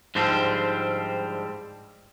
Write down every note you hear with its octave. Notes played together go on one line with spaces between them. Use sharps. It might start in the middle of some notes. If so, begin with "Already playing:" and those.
G#2 D3 F3 G3 C4